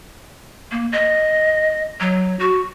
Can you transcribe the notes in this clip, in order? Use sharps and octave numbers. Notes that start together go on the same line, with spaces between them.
A#3
D#5
F#3
F#4